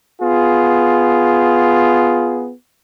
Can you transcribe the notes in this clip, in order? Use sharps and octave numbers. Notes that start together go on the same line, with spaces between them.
B3 F4 G#4